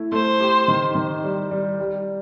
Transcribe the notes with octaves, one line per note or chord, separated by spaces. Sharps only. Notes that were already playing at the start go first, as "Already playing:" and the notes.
Already playing: A3 E4
A3 C5
G4
D#3
D#3
G3
G3
G3